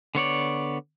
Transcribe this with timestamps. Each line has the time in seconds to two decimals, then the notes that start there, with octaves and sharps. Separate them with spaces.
0.15 D3 B3 C#5 D5